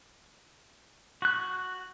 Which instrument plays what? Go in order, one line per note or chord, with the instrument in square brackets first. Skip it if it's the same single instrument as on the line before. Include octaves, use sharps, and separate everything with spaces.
[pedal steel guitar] F#4 F#6